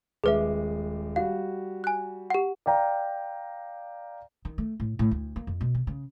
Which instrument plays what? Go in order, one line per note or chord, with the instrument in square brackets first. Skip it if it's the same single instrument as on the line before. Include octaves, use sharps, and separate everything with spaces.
[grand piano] D#1 G#3 D6 [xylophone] G#4 B4 E5
[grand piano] G3 F#4 [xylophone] F5
[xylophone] G#5 F#6
G4 F#5
[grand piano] D5 F5 G5 A#5
[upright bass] D#3
A3
A2
A2
D2
A#3
F2
B2
C3
C#3